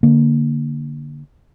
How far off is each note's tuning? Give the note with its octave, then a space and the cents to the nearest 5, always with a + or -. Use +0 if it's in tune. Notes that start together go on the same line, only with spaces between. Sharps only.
D3 +0 A#3 +0